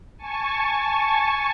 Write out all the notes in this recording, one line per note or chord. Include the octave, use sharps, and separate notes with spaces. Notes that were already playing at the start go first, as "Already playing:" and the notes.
G#5 A5 C#6